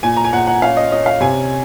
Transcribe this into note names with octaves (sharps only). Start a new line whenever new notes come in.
A#2 G#5
A#5
G#5
A#2 F#5
F#5
C#4 F5
D#5
C#4 D#5
F5
C3 G#5